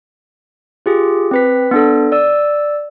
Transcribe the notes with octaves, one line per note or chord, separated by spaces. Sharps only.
F4 G4 G#4
C4 B4 B6
B3 D4 A4
D5 E6